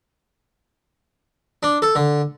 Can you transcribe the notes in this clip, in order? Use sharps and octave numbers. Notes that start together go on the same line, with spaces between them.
D4
A4
D3